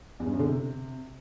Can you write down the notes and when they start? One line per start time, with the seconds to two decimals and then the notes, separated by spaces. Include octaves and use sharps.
0.20 E2
0.26 G2
0.33 F#2
0.39 D3
0.46 C3